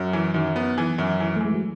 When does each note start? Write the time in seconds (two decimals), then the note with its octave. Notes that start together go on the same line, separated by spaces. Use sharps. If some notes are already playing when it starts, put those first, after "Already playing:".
Already playing: F#2 F#3
0.13 E3
0.34 F#2 D#3
0.56 B3
0.78 E3
0.98 F#2
1.20 E3
1.36 A3
1.41 E3 G#3
1.54 F#3